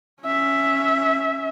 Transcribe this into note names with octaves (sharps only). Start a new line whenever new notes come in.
C#4 E5